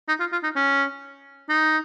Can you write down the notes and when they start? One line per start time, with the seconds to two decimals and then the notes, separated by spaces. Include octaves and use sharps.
0.08 D#4
0.20 F4
0.32 F4
0.43 D#4
0.56 C#4
1.49 D#4